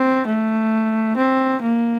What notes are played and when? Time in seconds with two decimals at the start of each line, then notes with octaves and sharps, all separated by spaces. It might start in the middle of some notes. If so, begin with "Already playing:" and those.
Already playing: C4
0.27 A3
1.17 C4
1.62 A#3